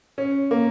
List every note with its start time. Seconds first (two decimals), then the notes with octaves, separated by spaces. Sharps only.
0.18 C#4
0.51 A#3